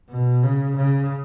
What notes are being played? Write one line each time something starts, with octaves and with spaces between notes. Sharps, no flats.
B2
C#3
C#3